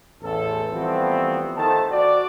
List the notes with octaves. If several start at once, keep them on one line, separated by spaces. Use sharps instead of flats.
A1 E2 A4
E3 F3 G3 A3 B3 C4
D#3 A3 C5 A5
F#4 D5